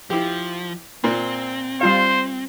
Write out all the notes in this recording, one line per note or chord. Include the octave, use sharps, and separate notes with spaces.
F3 E4 G4
A#2 C4
G3 F4 C5 F5